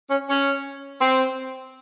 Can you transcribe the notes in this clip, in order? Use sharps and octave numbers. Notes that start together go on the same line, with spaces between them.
C#4
C#4
C4